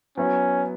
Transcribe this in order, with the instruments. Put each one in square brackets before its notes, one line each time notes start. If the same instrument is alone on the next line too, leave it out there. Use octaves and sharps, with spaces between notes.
[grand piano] F#3 B3 E4 [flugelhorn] C#4